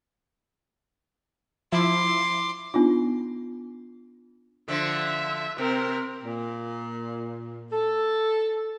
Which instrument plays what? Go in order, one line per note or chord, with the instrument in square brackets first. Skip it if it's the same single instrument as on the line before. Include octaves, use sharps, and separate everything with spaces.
[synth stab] F3 E4 [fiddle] C6 D6
[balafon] B3 D4 D#4 F4
[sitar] D3 F3 [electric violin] E5
[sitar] C3 [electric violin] C4 A#4
[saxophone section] A#2
A4